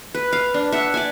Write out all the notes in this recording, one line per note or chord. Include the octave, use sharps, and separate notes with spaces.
B4
F5
D4
E5 F#5
D5 E5 G#5